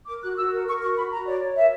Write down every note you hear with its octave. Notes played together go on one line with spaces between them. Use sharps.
A#4 D6
F#4 F#6
F#4 E6
A#4
A#4 C#6
F#4 C#6
F#4 B5
F#4 A#5
C#5 D5
C#5
A#4 E5